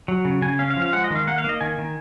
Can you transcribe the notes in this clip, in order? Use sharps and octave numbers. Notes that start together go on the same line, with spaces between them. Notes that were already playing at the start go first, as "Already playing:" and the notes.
F#3
C#3
C#3 G#5
C#4 F5
F5
F3
F5
G#3 F#5
D#5
D#3 F5
A#3 F#5
F5
A#3 D#5
D#3 G#5
D#3